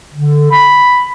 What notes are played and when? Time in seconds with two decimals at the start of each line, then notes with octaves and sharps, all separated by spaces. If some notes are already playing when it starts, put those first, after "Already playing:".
0.14 D3
0.50 B5